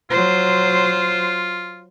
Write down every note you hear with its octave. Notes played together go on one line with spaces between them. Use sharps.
F#3 F4 C5